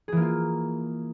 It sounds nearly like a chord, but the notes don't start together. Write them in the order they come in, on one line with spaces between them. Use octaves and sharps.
G#4 E3 A#3 F4